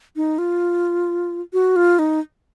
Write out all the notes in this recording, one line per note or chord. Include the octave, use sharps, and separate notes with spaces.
D#4
F4
F#4
F4
D#4